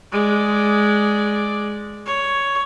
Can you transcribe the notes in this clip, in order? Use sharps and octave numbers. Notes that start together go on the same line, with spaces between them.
G#3 D5
C#5